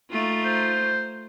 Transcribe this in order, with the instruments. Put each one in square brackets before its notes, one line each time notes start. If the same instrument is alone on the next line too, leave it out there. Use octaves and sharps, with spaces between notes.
[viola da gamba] A3 D#4 F4
[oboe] C5